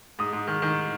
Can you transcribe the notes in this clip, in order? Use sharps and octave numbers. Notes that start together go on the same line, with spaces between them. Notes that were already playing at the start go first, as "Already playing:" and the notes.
G#2 D#6
G#2
D#3
D#3